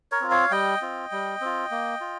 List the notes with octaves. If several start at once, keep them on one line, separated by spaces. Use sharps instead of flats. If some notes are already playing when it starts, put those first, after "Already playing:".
A#4 C#5
C4 F4
C#5 F5
G3 D#5 G5
C4 F4
G3
C4 F4
A#3
F4